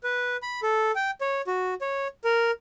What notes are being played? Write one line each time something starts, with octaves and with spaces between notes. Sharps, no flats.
B4
B5
A4
G5
C#5
F#4
C#5
A#4